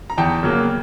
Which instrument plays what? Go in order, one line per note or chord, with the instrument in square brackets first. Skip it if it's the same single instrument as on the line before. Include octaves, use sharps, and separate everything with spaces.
[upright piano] A#5
[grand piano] E2 [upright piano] G5 A5
[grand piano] C#3 F#3 A#3